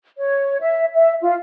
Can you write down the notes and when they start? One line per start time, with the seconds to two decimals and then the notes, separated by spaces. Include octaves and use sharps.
0.18 C#5
0.61 E5
0.94 E5
1.22 F4